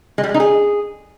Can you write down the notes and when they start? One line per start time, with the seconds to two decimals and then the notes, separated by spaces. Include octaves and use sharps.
0.18 G#3
0.24 G3
0.29 G#3
0.34 D#4
0.40 G#4